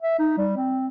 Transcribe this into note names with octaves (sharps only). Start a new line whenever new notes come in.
E5
D#4
G3
C4